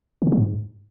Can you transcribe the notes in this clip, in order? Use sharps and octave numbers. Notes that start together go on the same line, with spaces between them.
D3
C#3
F#3
G#2